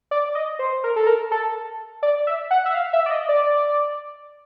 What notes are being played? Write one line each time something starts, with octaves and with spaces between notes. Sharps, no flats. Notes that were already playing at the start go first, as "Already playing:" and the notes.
D5
D#5
C5
A#4
A4
A#4
A4
D5
E5
F#5
E5
F5
E5
D5
D#5
D5